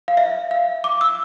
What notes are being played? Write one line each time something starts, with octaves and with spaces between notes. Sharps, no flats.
F5
E5
F5
D6
E6